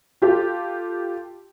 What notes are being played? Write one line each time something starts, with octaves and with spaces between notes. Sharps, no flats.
F4 G4 A4